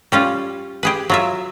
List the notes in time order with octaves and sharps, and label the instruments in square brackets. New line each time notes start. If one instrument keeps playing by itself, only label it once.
[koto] G3 C#4 F4
G4 G#4 B4
F#3 F4 E5